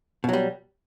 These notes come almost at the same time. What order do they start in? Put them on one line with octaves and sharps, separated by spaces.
B2 F#3 G3